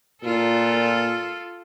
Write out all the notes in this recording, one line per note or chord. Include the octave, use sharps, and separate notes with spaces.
A#2 F4 A4